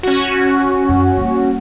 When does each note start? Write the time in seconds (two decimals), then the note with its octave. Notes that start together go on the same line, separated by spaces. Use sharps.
0.03 C#4 F#4
0.89 F#2
1.17 G3 A#3